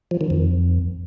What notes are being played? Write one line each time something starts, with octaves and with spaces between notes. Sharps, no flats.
F3
D#3
F2